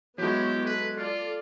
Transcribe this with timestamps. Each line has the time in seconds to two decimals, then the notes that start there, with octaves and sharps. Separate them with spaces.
0.18 F#3 G#3 B3 E4 G4 C#5
0.65 A4 B4
0.97 F4 A4 D5